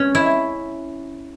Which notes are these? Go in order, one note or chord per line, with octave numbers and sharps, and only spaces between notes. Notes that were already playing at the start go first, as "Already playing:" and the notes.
Already playing: C#4
E4